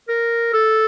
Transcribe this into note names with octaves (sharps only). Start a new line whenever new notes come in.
A#4
A4